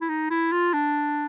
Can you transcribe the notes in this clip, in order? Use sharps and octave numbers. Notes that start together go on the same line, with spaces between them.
E4
D#4
E4
F4
D4